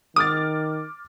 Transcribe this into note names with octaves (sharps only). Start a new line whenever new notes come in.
D#3 D6 D#6 F6 A6